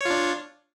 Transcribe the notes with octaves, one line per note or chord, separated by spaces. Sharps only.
D4 F4 C#5